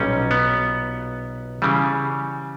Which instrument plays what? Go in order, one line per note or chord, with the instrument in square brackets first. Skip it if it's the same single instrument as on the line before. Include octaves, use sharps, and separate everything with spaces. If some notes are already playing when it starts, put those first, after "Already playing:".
Already playing: [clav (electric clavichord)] B1 A#2 G3 C#4
B3
C#3 E3 G3